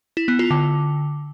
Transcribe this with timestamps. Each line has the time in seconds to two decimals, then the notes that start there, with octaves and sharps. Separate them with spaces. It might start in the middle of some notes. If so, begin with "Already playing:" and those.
0.17 E4
0.28 B3
0.39 F4
0.51 D3